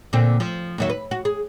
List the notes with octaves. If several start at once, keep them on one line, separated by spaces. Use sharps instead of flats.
A#2 D3 C4
F3
D#2 F#3 E5
B4
F#4
G#4